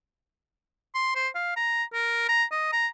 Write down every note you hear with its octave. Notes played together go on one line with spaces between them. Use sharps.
C6
C5
F5
A#5
A#4
A#5
D#5
A#5